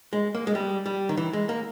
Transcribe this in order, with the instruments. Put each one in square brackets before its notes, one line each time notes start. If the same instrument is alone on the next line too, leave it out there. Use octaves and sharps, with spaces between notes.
[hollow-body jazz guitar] G#3
A#3
G#3
G3
G3
D#3
E3
G#3
A#3